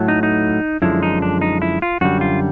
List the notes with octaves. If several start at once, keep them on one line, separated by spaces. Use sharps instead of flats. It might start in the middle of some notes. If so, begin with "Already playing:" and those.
Already playing: A2 F#3 A3
D#4
D#4
F#2 D3 F3 G#3 E4
D#4
D4
D#4
E4
F4
F#2 D3 G3 F#4
F4